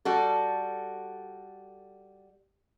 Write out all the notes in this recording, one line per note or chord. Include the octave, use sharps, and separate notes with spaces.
G3 F#4 A4